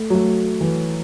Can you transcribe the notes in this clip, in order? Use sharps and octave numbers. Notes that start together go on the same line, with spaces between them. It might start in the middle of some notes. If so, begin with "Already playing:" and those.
Already playing: A3
F#3
A3
E3